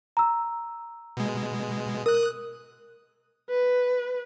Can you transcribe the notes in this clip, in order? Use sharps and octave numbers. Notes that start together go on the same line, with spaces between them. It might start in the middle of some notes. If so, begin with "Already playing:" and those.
A#5 E6
B2 G#3
A#4 D#6 F#6
B4